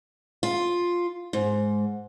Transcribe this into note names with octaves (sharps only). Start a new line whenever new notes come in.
F4
G#2